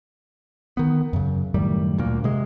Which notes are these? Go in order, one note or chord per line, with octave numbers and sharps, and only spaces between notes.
D#3 B3
F#2 C#3
F#2 A2 D#3 G3
D2 A#2 A#3
C3 G#3